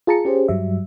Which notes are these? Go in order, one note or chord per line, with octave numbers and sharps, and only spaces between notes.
F4 G#4 A5 A#5 C#7
C#4 G4 G#4 C5
G2 F#3 G3 E5